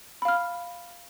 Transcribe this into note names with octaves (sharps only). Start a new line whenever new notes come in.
F5 B5 F6